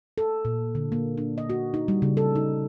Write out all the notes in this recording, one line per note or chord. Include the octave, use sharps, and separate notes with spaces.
A4
A#2
D3
A#3
D4
D#5
F#4
D#4
G3
C#3
A4
D#4